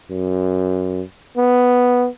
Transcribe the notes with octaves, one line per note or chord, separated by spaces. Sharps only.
F#2
B3